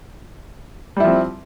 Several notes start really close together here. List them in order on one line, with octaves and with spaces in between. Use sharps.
G3 E4 F3 C4